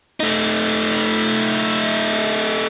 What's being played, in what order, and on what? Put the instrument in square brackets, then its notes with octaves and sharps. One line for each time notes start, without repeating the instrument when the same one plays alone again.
[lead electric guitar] A3 D#4